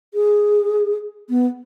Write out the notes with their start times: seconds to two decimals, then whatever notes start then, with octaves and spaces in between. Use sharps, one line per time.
0.14 G#4
1.30 B3